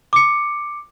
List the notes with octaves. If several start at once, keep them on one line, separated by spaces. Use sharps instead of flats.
D6 C#7